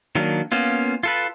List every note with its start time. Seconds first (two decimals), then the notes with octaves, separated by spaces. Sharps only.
0.15 D#3 F#3 A#3 D4
0.52 A#3 B3 C#4 F4
1.03 F4 A4 B4